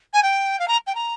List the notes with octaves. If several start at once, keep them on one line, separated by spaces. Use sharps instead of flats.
G#5
G5
F5
A#5
G5
A#5